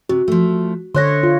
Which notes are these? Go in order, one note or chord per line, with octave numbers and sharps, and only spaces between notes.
C3 F#4
F3 A3
D3 C5 C#5 D#5 E5 C6 F#6 A#6
F4